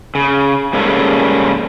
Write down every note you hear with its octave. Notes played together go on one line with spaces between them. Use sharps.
C#3
G#2 C#3 G3 A#3 C#4 A4